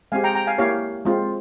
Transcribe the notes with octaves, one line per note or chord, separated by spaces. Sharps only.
G#3 C4 G4 F5 G#5
G5 A#5
G5 A#5
F5 G#5
A#3 E4 G4 C#5 F5
G#3 C4 F4